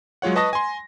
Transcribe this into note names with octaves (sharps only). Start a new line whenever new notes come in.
F#3 G#3 F4 C#5 F#5
B4 D#5 A5 C#6 D#6 A#6
G#5 C6